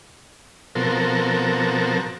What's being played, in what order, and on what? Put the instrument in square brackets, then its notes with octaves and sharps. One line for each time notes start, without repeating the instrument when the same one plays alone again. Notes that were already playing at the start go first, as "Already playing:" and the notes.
[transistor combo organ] B2 F3 C4 F#4 A4 A#4